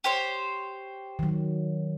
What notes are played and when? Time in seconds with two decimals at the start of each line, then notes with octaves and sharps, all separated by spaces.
0.04 G4 C5 C#5
1.19 D#3 F#3